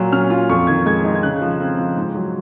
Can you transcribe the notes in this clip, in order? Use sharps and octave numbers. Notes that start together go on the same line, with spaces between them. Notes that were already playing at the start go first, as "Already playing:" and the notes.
Already playing: A#2 F#3
C#4 F6
F4
F2 C#6
D#3 G#6
G#3 G#6
D#4
G#6
C#3 F#6
F3
C4
F4
G#2
F#3